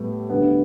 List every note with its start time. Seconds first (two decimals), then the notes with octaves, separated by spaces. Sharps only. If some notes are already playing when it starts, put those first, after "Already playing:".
Already playing: A2 G3 B3
0.29 D2 D3 G3 B3